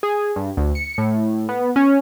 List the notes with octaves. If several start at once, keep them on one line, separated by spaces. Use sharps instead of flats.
G#4
G2
D2
C#7
A2
B3
C#4